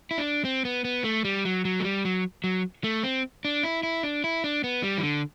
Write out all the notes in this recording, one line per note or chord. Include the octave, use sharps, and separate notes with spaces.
E4
D4
C4
B3
B3
A3
G3
F#3
F#3
A3
G3
F#3
F#3
A3
C4
D4
E4
E4
D4
E4
D4
B3
G3
E3
D3